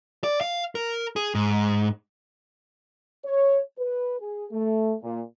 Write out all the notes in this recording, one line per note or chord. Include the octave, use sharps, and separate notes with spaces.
D5
F5
A#4
G#4
G#2
C#5
B4
G#4
A3
A#2